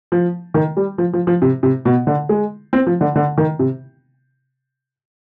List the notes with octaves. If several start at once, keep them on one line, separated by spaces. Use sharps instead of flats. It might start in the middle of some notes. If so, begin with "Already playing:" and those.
F3
D#3
G3
F3
F3
F3
C3
C3
B2
D3
G#3
C4
F3
D3
D3
D#3
C3